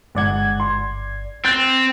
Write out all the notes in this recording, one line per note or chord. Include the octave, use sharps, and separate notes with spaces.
G1 G#2 D5 F#5 G#6
C6
C4 F#6 G6 A6